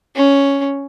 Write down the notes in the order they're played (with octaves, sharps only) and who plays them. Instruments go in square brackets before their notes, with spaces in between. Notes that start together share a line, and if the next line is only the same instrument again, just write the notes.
[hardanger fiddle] C#4